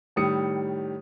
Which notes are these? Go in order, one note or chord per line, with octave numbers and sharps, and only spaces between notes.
A2 D#3 G3 D#6 C#7